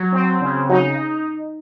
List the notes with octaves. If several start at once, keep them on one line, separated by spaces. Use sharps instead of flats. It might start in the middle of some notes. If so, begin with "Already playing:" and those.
Already playing: F#3
C4
C#3
F#3 D#4